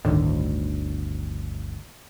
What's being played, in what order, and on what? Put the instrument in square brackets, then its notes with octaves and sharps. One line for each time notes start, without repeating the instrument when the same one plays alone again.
[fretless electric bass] G1 D2 [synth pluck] A2 D3 D#3